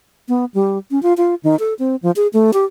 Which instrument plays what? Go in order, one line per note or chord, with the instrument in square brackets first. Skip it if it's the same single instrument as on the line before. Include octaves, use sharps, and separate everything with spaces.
[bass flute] B3
G3
C#4
F4
F4
D#3
A4
C4
F3
G#4
A3
G4